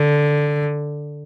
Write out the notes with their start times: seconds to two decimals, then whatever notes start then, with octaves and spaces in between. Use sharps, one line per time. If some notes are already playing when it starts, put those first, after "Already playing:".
Already playing: D3